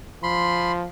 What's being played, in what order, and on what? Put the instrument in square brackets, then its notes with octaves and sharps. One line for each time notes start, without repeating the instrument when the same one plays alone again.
[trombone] F3 [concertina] B5 C6